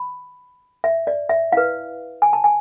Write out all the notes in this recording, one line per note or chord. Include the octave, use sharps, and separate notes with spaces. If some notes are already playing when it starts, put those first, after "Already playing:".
Already playing: B5
E5
D5
E5
E4 B4 F5
G#5
A5
G#5